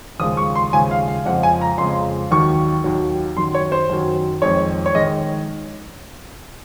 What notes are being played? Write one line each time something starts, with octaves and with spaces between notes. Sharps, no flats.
D#2 C#3 F3 G#3 D#6
C#6
C6
D#2 C#3 F3 G#3 G#5
F5
F5
F2 C#3 F3 G#3 F#5
G#5
A#5
F2 C#3 F3 G#3 C6
D#2 D#3 F#3 C#6
D#2 D#3 F#3
F#2 D#3 F#3 C6
C#5
C5
F#2 D#3 F#3
F2 D#3 G#3 C#5
C#5
D#3 G#3 D#5